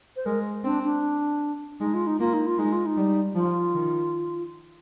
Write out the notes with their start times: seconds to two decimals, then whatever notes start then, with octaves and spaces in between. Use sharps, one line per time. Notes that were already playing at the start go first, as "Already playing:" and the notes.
0.16 C5
0.26 G#3 A#4
0.64 C4 D4
0.85 D4
1.80 G#3 D#4
1.94 F4
2.07 D#4
2.20 A#3 F4
2.33 D#4
2.47 F4
2.58 G#3 D#4
2.72 F4
2.86 D#4
2.97 G3
3.35 F3 F4
3.74 D#3